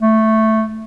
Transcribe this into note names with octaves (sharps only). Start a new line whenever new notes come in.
A3